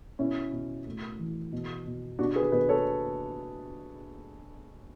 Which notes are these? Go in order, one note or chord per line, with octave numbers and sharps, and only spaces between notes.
B2 C#4 E4
B2
A2
E3
B2
B2
B2 D4 F#4
G#4 B4
B2 G#4 B4
A4 C#5